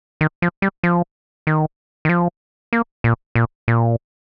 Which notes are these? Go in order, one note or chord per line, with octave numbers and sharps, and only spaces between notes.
D#3
F3
G3
F3
D#3
D#3
F3
A#3
A#2
A#2
A#2